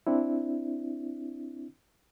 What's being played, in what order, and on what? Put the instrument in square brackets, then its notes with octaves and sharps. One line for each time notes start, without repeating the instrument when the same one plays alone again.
[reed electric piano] C4 D4 E4